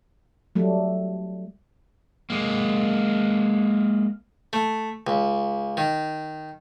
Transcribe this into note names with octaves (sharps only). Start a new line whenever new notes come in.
F#3 G3 A3
G#3 A#3
A3
C#2
D#3